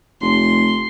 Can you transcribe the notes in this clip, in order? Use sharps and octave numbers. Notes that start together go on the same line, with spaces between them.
F1 C6